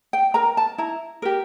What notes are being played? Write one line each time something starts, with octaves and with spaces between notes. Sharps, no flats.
G5
A#4 A#5
A5
E4 A#5
G4 A#4